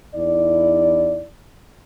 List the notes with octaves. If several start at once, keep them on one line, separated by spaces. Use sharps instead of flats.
E2 D#4 E4 D5